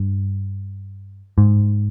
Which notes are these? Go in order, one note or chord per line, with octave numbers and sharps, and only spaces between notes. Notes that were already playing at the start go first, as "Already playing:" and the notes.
Already playing: G2
G#2